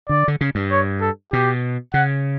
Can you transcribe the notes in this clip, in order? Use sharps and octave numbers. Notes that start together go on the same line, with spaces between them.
D3 D5
D3
C#3
G2
C#5
A4
B2 G4
C#3 F#5